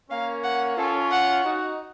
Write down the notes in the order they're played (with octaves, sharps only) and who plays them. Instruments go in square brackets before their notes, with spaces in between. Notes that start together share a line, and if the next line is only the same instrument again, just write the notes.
[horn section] A#3 C#4 [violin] F5
[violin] F#5
[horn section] C#4 F4 [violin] A4
[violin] F#5
[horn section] D#4 F#4